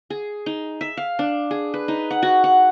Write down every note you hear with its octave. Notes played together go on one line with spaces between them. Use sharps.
G#4
D#4
E5
F5
D4
G#4
B4
D#4
F#5
F#4
F#5